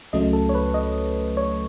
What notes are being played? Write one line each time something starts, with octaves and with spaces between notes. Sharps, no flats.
C#2 C#3 F#3 A3 D#5
A4
C#5
B4
D#5
C#5